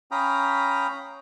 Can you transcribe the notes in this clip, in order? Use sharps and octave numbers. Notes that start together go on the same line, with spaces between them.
C#4 F5 G5 A#5 B5 D#6